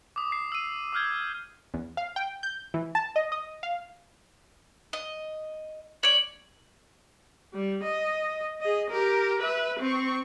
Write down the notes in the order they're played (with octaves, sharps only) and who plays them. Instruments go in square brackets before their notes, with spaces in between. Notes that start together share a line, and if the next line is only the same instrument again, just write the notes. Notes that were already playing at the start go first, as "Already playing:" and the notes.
[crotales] D6 D#6
C7
E6 D#7
D6 D#6 F6 G6 G#6
[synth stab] E2
F5
G5
G6
E3
A5
D#5
D#5
F5
[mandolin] D#5
[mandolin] C#5 D5 [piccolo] F#7
[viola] G3
D#5
G#4 D#5
G4 A#4
B4 E5
C4 C#6